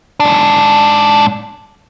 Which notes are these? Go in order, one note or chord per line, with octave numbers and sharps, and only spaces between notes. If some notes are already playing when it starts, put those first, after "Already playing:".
G#2 D4